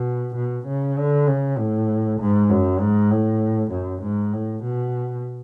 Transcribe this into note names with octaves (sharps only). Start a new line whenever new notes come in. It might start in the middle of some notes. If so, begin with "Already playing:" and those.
Already playing: B2
B2
C#3
D3
C#3
A2
G#2
F#2
G#2
A2
F#2
G#2
A2
B2